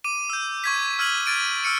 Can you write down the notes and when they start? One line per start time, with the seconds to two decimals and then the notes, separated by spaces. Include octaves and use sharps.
0.04 D6 D#7
0.30 E6 G6
0.64 C#6 G#6 B6
0.99 E6 F6 G#6 D#7 F#7
1.26 F6 G#6 A6 D7 D#7
1.64 E6 F6 C#7 D#7